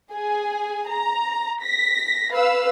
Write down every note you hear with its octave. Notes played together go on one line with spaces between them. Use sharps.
G#4 G#5
A#5
A#6 B6
B4 F5 E6